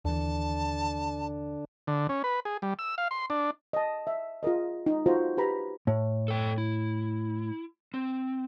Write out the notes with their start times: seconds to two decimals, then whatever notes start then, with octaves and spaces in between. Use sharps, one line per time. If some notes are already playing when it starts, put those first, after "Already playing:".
0.05 D#2 D3 E3 D4 A5
1.87 D3
2.09 C#4
2.24 B4
2.45 G#4
2.62 G3
2.79 E6
2.98 F5
3.11 C6
3.30 D4
3.73 D#5 A5
4.07 E5
4.43 F4 G#4 A#4 D#5
4.86 D#4
5.06 F4 F#4 A4 C5 A#5
5.37 G4 B4 A#5 B5
5.87 A2
6.28 A4 G5
6.58 E4
7.94 C4